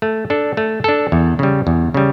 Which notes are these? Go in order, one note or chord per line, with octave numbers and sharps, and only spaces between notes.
A3
D4 A4
A3
D4 A4
E2
C#3 G3
E2
C#3 G3